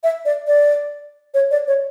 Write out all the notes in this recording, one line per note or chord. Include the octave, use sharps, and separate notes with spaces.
E5
D5
D5
C#5
D5
C#5